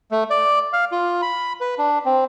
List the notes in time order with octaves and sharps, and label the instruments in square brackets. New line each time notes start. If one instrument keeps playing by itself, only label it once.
[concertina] A3
D5
F5
F4
B5
B4
D4
C4